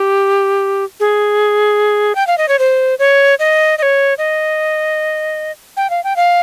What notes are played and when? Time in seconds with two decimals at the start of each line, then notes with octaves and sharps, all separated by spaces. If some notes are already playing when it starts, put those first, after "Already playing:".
Already playing: G4
1.00 G#4
2.15 G5
2.27 F5
2.38 D#5
2.48 C#5
2.59 C5
2.99 C#5
3.39 D#5
3.78 D#5
3.82 C#5
4.18 D#5
5.77 G5
5.90 F5
6.04 G5
6.16 F5